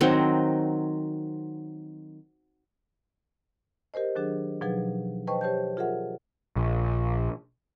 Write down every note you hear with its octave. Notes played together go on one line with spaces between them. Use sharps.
D#3 F#3 C4
G4 A#4 C5 D#5
D#3 F#3 D4 G#4
B2 F3 F#3 D#4 G#4 B4
B4 C5 D#5 G5 A5 C#6
G4 C5 C#5 A5 G6
F4 G#4 A#4 E5 F#5
A#1